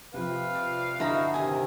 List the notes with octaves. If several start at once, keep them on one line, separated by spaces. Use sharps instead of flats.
C3 F3 B4 F5
D5
G1 D#4 E4 F#4 A4 A#5 B5
C3 D#3 E5 G#5 D#6